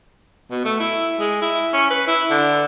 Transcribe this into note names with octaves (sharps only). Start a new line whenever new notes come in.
B2
A3
E4
G#3
E4
C#4
B4
E4
D3